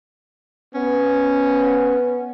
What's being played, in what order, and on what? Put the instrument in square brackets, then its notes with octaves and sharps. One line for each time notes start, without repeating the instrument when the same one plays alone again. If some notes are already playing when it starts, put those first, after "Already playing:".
[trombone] B3 [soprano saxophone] C#4